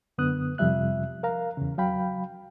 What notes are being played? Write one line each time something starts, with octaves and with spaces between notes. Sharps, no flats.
F#2 D3 B3 D#6 F#6
F2 C3 F3 G3 E5 F#6
A#4 F5 A#5
E2 C#3
F#3 F5 G5 B5